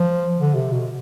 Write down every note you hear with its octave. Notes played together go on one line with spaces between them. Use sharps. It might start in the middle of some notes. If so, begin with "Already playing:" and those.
Already playing: F3
D3
C3
B2